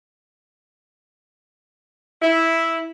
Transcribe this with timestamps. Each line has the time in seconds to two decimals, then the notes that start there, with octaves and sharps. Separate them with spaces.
2.22 E4